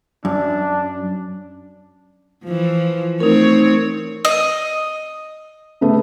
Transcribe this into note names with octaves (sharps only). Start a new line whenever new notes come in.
F#2 D4
E3 F3
A3 C4 D#4 A#4 C#5
D#5
C#3 A3 B3